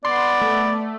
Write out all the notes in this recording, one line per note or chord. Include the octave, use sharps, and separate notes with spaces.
B3 D5 C6
A3